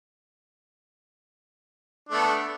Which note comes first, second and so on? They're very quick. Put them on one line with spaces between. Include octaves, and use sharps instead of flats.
D4 A3 B3